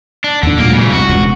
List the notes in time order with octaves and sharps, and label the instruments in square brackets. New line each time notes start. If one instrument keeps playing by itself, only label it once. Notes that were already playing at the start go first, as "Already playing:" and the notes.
[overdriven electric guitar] D4
[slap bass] D#2 D4 [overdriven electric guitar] D3
[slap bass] A#2 F#3 G#3 [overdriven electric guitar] A#3
[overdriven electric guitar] C#3 E3
[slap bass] C2 [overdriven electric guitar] F#4
[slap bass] E1 C#2 C3